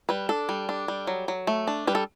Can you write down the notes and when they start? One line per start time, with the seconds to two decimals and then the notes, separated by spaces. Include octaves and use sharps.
0.09 G3 B4
0.29 D4 A4
0.49 G3
0.69 D4
0.88 G3
1.07 F#3
1.28 F#3
1.47 A3
1.67 D4
1.87 G3 B4
1.95 A4